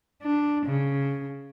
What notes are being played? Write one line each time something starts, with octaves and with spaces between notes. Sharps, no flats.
D4
C#3